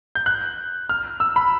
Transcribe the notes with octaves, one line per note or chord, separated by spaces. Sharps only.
G6
F#6
F6
E6
B5